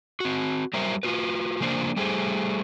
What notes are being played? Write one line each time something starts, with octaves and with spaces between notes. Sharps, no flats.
C4 F#4
F#3 G3 A#4 C5 E5
F4 F#4 B4
C#3 F3 A#3 D4 C5
G3 A3 G4 G#4 C5